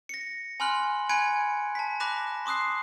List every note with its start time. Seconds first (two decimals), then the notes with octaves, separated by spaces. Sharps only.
0.09 A#6 C#7
0.60 G#5 B5 C6 F6 F#6 F#7
1.09 G#5 B5 F#6 G#6 C#7 D7
1.75 A5 B6
2.00 B5 D6 F#6 A#6 B6 E7
2.46 C6 D6 D#6 F#6 C7